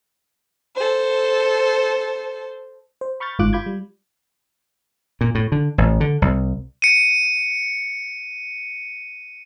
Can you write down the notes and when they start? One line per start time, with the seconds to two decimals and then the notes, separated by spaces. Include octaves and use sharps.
0.76 A4 C5
3.01 C5
3.20 B5 C#6 F6 G6 A6
3.39 G1 G#2 F4 D6 F#6
3.53 F4 B5 D6 G6 G#6
3.66 G3
5.21 A#2
5.35 A2
5.52 D3
5.78 A1
6.00 D3
6.22 C2
6.82 C#7 D#7